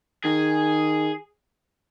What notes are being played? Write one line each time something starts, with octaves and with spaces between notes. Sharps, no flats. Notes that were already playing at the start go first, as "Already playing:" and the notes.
D#3 G#4